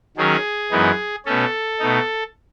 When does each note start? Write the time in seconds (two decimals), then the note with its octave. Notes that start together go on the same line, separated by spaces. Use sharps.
0.17 D#3 F#3 C#4 G#4
0.71 F#2 E3 G#3 B3 D#4
1.25 B2 A3 C#4 A4
1.80 B2 A3 D#4